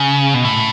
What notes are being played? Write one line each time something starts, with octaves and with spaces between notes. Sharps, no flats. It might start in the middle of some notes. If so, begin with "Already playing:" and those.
Already playing: C#3
B2
A2